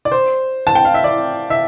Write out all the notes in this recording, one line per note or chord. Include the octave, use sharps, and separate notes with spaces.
D5
C5
A5
G5
F5
E5
D5
E5